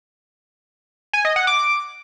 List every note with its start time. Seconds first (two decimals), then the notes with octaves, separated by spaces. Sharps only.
1.13 G#5
1.25 D#5
1.36 F#5
1.47 D6